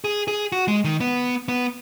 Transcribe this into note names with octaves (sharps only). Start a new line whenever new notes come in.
G#4
G#4
F#4
G#3
D#3
B3
B3